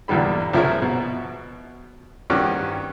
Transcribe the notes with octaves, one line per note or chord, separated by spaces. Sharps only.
B1 E2 A#2 D3 G3 B5
C2 F3 E4 G#4 A#4 C#5
B2
G2 D#3 C4 C#4 F#4 G4